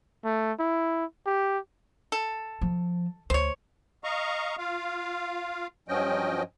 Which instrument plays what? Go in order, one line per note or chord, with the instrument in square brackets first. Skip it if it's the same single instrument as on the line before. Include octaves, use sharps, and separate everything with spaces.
[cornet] A3
E4
G4
[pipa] A4
[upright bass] F3
[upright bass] D2 [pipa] C5 C#5
[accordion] D#5 F5 A#5 C#6
F4 F5
G2 F3 F#3 C#4 D#5 G5